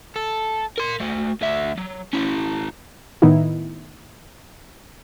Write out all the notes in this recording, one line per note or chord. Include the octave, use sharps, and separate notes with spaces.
A4
A#4 C6
A3 F#4
D2 E5
F#3
C#4 E4
A2 D#3 B3 D#4 E4